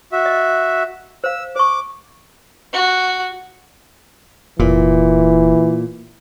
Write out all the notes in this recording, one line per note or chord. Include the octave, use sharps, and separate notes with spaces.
F#4 E5
D#5
C5 F5 E6
C5 C#6 D6
F#4
F1 A#2 E3